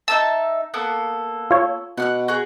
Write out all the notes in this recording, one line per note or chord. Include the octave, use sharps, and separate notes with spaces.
D#4 E5 A5 E6
A#3 B3 A4
F4 C#5
B2 F#5 F6 F#6
F#4 G#4